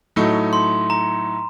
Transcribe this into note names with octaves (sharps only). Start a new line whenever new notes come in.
A2 F#3 A3 D#4
C6
A#5